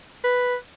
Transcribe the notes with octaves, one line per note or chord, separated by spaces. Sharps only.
B4